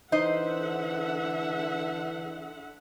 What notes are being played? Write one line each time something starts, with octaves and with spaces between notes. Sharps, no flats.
D3 E3 D#4 C5 D#5 E5 F#5